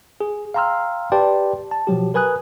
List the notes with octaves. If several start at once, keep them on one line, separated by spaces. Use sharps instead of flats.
G#4
F5 G5 A#5 C6 E6 F6
G4 B4 D5 G5 A5 C6
A5
B2 F3 F#3 G4
A#4 B4 G#5 D#6 F#6